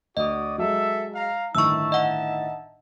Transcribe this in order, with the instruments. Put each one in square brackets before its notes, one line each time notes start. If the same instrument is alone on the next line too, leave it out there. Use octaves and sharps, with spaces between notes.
[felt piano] D2 [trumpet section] F#4 D5 D#6 [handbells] D#5
[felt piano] F#3 G#3 [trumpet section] A4 E5
[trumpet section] F5 A#5
[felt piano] G1 A2 D#3 [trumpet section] D#4 E5 A5 [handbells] C#6 E6
[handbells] D#5 F#5